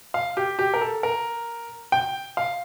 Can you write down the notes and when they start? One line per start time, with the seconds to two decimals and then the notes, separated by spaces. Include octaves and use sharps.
0.14 F5
0.37 G4
0.59 G4
0.74 A#4
0.81 A4
1.03 A#4
1.92 G5
2.37 F5